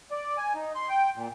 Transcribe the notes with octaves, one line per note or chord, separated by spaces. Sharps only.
D5
G#5
D#4
C6
G5
A#2